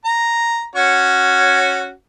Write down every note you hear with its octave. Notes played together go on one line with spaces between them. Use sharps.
A#5
C#4 F#4 C#5